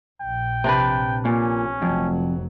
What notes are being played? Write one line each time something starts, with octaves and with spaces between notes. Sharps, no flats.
A#1 G5
C3 D4 B4
A#2 C#4
F1 F2 F#3